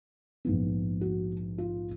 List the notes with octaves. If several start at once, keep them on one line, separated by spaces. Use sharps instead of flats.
A#1 G#2 F3 B3
F#4
F4